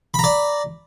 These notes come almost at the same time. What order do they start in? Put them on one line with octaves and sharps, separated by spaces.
B5 A#5 D5